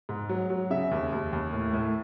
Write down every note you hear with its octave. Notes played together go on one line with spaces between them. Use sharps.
G#2
F#3
F#3
C#3 E5
D#2
D#2
D#2
A2
A2